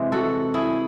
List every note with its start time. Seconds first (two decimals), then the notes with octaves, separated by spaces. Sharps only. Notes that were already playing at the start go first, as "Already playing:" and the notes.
Already playing: C3 E3 G#3 C5
0.12 F#4 A4
0.54 E4 G#4